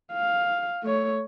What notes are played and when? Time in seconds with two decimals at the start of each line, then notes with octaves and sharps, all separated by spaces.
0.13 F5
0.83 A3 C#5